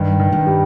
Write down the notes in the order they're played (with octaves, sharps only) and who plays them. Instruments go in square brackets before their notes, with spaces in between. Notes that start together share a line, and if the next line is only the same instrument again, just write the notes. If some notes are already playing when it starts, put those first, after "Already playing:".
Already playing: [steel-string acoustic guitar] G2 [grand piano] D#3
[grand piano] D#3
[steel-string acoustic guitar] G2
[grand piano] G3